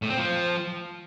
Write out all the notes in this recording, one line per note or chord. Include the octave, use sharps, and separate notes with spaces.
A2
C4
F3